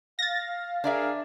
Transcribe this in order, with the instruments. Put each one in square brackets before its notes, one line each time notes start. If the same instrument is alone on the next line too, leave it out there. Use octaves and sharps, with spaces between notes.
[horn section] F5 [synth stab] A6 A#6
[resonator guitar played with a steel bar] D4 D5 E5 [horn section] G#4 A#4 F5